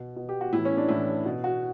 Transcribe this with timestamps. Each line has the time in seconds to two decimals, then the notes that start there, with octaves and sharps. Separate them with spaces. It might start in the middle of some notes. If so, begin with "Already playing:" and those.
Already playing: B2
0.16 B2
0.29 G4
0.41 F#4
0.53 A2 E3 E4
0.65 C#4
0.77 D4
0.88 A2 E3 E4
1.25 B2
1.44 F#4